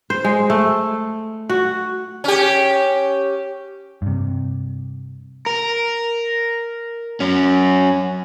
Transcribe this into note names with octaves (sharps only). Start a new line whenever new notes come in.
C5
G#3
A3
F#4
C#4 G4
G2 C3
A#4
F#3 C#4